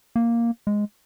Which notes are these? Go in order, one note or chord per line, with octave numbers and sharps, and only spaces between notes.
A#3
G#3